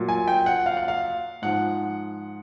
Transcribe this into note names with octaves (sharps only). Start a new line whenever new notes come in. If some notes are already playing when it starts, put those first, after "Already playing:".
Already playing: A#2 F#3
G#5
G5
F#5
F5
F#5
F5
G#2 F3 F#5